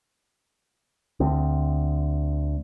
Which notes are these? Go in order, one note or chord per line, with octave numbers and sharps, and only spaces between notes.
D2 C4